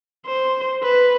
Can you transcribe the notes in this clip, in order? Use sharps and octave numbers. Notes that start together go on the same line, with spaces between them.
C5
B4